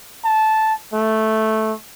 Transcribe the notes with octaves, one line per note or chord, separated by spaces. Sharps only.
A5
A3